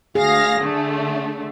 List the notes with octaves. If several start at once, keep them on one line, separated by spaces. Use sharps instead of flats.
D2 G#4 F5 A#6
D3 A3